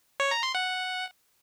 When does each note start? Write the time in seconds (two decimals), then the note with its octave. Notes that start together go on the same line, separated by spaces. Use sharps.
0.20 C#5
0.31 A#5
0.43 C6
0.55 F#5